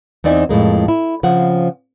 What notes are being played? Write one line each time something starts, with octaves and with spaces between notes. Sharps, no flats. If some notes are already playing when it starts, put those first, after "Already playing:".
E2 C4 D#4 D5 E5 G#5
F2 A2 G#3 A#3
E4
C#3 F3 C4 F#5